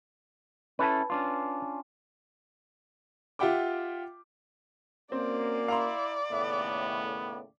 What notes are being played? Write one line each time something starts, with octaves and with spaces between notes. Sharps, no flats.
C#4 E4 A4 B4 A5
C#4 D4 F4
F4 G4 E5 F#5 G5 D6
A#3 C4 C#4 F#4 D5
E4 F5 A#5 C6
D#2 A2 C#3 B3 E5